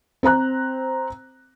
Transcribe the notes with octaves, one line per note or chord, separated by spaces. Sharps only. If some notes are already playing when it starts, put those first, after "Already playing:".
C4 C5 A#5 F#6